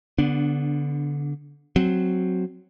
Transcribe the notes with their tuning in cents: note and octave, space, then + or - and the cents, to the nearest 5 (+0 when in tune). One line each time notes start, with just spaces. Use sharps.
D3 -20 B3 +0 D4 +0
F#3 +0 C4 +0